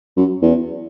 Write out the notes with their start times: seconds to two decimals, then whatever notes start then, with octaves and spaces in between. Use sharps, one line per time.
0.17 F#2
0.42 E2